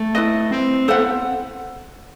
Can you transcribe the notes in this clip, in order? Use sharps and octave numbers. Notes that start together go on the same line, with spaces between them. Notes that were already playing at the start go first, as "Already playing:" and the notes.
Already playing: A3
E4 B4 D#5
C4
B3 A4 C5 F#5